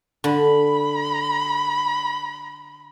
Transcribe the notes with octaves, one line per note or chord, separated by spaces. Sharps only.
D3 B5